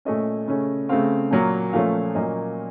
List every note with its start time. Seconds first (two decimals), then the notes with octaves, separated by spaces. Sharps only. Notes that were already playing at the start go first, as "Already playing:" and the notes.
0.05 A#2 A3 C#4 D#5
0.48 C#3 A3 C#4
0.89 C#3 A3 C4 F5
1.31 A#2 F#3 A#3
1.73 A#2 F3 A3 C#4 F5
2.15 A#2 F#3 A#3 C#4 D#5